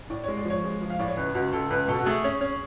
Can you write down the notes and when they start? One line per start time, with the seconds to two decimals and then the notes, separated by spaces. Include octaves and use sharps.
0.10 A2 D5
0.24 G#3 C#5
0.37 D5
0.45 F3 C#5
0.64 G#3
0.81 F3
0.90 F5
0.99 A2 D5
1.08 C#5
1.17 C#2 B4
1.34 C#2 F#4
1.52 C#2 A4
1.70 C#2 B4
1.88 B2 A4
1.99 F#4
2.06 A3 G#4
2.24 C#4
2.41 C#4